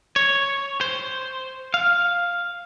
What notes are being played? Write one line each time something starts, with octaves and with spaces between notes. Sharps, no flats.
C#5
C5
F5